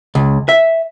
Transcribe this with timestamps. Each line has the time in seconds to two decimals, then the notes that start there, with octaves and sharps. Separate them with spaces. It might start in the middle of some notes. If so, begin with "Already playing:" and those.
0.15 C#2
0.49 E5